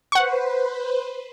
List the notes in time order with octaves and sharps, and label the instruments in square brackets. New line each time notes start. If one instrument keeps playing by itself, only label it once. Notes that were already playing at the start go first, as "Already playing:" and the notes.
[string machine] B4 C5 [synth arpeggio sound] F#5 C#6